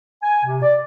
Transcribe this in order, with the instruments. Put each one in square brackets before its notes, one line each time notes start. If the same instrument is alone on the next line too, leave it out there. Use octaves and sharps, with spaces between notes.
[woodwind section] G#5
C3
D5